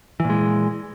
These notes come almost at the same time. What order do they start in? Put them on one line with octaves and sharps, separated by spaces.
E3 A#2 G#3